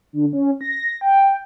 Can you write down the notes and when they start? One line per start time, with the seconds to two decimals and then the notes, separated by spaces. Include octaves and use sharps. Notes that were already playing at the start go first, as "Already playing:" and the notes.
0.13 D3
0.33 C#4
0.61 A#6
1.01 G5